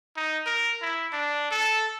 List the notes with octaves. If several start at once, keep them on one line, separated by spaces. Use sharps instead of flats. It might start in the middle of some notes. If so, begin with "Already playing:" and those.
D#4
A#4
E4
D4
A4